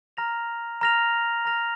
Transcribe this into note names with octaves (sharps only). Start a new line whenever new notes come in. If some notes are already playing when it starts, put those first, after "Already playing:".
A#5 F6 A#6 F7
A#5 F6 A#6 F7
A#5 F6 A#6 F7